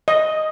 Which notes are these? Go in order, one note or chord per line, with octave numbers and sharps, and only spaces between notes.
D#5